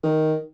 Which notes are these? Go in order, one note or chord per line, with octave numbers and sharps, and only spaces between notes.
D#3